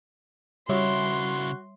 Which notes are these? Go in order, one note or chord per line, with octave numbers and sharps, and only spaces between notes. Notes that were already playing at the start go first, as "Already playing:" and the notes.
C#3 G3 E4 F#4 C#5 E5 C6